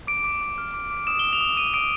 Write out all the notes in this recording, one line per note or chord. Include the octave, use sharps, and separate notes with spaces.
D6 D7
D6
D6
F6
D6
D6
D#6 E7
G7
D#6
F7
D#6
D#6 D#7
D#6 D7